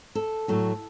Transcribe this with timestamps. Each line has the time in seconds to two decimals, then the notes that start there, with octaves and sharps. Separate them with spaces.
0.15 A4
0.48 A2 F#3 A3